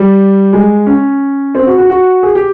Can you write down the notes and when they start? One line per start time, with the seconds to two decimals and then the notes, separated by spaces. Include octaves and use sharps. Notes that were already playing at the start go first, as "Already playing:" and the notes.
Already playing: G3
0.53 G#3
0.87 C#4
1.55 C4
1.67 F#4
1.78 F#4
1.90 F#4
2.23 G#4
2.35 G4